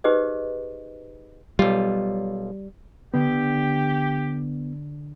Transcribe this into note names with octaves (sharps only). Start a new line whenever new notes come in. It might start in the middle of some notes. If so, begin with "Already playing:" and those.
D#4 G4 G#4 B4 C5 D#5
B1 G3 F4
D3 B3 G4